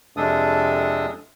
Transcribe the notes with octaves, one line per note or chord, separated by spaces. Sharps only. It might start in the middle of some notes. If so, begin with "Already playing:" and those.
F2 C3 G#3 D4 A4 D#6